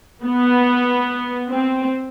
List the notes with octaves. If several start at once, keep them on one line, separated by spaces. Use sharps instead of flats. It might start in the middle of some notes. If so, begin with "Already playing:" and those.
B3
C4